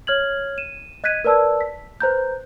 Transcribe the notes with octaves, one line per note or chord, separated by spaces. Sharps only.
C#5 F6 G#6 F#7
D#7 E7
D#5 F#6 G#6 B6 D#7
A#4 B4 D5 A5 E6
B6
B4 C5 A#5 G6